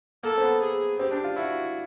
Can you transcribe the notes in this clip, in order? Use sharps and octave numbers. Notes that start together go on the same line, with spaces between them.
A#3 A4
C4
B3
G#4
C4 G4
D4
F4
E4 F#4